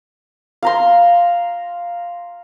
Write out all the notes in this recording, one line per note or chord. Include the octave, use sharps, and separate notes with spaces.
F5 A#5 C6